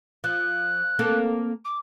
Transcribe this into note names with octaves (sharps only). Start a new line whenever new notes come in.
F3 F#6
A#3 C4 A4
D6